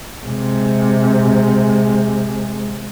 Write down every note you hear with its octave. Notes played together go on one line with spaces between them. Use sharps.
C3 G#3